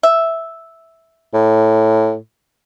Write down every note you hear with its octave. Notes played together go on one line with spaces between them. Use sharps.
E5
A2